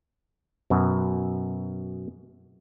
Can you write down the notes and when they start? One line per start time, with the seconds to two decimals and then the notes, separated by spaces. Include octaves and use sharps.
0.70 F#2 B2